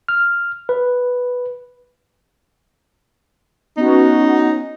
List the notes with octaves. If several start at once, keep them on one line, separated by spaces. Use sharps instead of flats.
F6
B4
B3 C#4 D#4 F#4